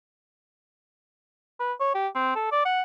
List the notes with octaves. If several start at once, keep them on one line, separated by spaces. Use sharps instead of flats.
B4
C#5
G4
C4
A4
D5
F#5